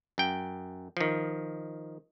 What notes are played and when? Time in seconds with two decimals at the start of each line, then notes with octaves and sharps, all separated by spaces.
0.18 F#2 G5
0.97 D#3 F3